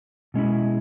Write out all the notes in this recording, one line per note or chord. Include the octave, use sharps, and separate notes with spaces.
B2 G#3 C#4 E4